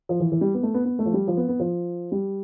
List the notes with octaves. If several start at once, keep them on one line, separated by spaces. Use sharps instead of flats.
F3
E3
E3
G3
B3
A3
B3
B3
A3
F3
G3
F3
B3
B3
F3
G3